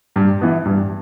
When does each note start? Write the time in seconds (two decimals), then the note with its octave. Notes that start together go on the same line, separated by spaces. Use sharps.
0.16 G2
0.41 E3 B3
0.65 G2